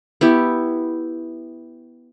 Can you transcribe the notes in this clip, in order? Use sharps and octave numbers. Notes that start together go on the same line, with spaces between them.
B3 E4 G4